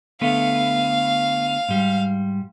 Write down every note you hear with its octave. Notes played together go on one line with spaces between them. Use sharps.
D3 A3 B3 F5
G#2 G3